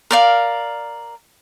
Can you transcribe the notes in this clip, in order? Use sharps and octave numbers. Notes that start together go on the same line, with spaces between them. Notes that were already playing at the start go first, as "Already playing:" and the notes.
A#4 D5 F5